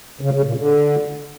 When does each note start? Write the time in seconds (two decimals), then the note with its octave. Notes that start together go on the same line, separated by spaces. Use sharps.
0.21 C#3
0.33 C#3
0.45 A#2
0.57 D3